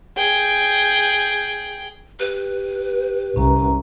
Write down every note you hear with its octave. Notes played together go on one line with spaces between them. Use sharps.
G#4 G5
G4 B4
C2 C#4 A#5